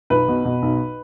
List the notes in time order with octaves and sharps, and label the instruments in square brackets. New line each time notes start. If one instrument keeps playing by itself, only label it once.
[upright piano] B1 B4
B2
B2
B1